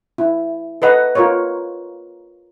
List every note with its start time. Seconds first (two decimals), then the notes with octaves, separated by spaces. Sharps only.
0.18 E4
0.82 A4 B4 D#5 F#5
1.15 F4 A#4 C5 C#5